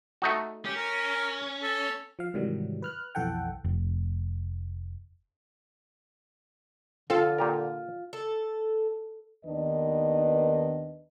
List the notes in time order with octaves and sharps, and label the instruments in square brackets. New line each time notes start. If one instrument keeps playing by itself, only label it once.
[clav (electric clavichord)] A3 D#4 F#4
[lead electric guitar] C#4 [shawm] G4
[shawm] A#4
A4
[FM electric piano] F3 F5
G#2 C3 D#3 E3 F#3 G3
B4 F6 F#6
B1 F2 E3 A4 F#5 G5
[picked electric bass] F1
[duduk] D3 [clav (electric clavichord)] C4 [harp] F4 [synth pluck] A4 F5
[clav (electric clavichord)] A#2 G4 A#4
[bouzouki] A4
[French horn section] D#2 D#3 B3 D4 B4 D#5